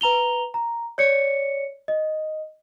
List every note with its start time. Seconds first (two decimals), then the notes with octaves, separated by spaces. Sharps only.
0.01 B4 A#5 F7 G7
0.54 A#5
0.98 C#5 D5 C#7
1.88 D#5